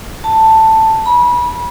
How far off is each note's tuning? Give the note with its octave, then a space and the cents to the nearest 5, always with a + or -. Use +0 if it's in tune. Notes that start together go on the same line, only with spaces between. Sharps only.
A5 +10
B5 -30